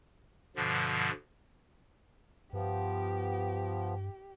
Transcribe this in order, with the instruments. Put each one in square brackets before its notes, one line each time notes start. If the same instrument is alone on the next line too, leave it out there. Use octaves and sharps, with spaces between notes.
[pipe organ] G2 B2 D3 F3
[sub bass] G2 [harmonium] F3 B3 [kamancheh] G4